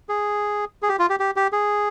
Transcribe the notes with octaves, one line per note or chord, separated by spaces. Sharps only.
G#4
G#4
G4
F4
G4
G4
G4
G#4